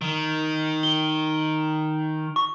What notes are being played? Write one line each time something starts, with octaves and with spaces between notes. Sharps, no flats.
D#3
G7
C#6